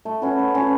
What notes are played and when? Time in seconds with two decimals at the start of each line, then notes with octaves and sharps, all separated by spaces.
0.05 A3
0.22 C#4 F#4 B4
0.39 A3
0.55 C#4 F#4 B4